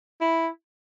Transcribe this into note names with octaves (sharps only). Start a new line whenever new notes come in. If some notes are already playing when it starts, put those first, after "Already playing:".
E4